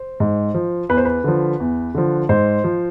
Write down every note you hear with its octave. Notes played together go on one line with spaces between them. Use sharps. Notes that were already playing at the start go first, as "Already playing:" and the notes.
Already playing: C5
G#2
F3
E2 B4
C5
B4
D3 F3
E2
D3 F3
G#2 C5
F3